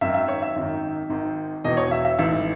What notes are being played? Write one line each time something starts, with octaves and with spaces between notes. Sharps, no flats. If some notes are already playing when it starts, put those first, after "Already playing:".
G#1 F#2 D#3 E5
E5
C#5
E5
G#1 F#2 D#3
G#1 G#2 D#3
E1 E2 B2 D#5
C#5
E5
E5
A1 G#2 E3 E5